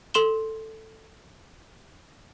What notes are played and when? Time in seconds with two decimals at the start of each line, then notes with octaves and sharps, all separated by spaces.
0.14 A4 C6 E7 G7